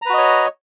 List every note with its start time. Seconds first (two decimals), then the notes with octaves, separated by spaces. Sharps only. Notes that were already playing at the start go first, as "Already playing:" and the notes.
0.02 A#5
0.06 B4
0.10 F#4
0.14 D#5
0.18 C#5